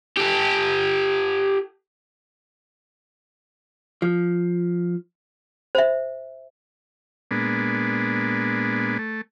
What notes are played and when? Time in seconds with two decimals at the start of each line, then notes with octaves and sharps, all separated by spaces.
0.17 G4 A4
4.02 F3
5.75 C5 E5
7.31 A#2 G#3 B3 D4
8.99 A3